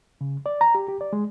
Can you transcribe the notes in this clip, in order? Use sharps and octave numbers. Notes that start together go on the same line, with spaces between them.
C#3
D5
A#5
G4
G4
D5
G#3